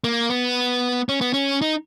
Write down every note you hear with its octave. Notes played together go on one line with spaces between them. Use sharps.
A#3
B3
C#4
B3
C#4
D#4